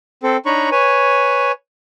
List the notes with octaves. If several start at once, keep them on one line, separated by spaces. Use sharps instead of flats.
C4 A4
D4 D#4 C#5 A#5 B5 C#6
B4 C#5 G#5